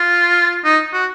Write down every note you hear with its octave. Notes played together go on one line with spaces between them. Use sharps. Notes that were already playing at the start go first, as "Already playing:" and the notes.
Already playing: F4
D#4
F#4